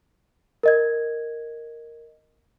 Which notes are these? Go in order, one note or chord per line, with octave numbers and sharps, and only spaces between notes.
A#4 D#5 G#6